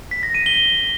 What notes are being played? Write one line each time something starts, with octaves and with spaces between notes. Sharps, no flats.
B6
A#6
D#7
G7